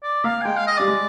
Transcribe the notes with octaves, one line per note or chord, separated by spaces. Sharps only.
D5
A#3 F5
G#5
G#3 G5
F5
D#5
G3 D5
G#3